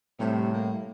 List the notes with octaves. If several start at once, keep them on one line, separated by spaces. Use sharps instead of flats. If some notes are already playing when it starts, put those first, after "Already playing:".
A2 C3 G3 A3
A#3